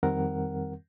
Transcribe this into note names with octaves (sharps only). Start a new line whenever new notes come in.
F2 D#3 G3 C4 A#4 F#5